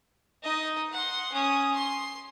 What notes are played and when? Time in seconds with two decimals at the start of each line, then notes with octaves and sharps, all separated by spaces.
0.43 D#4 D#5
0.92 F#5 C6
1.32 C#4 D#6
1.75 C6